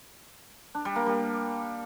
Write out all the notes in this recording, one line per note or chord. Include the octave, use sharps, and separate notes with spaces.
D4
G3
A#3
G3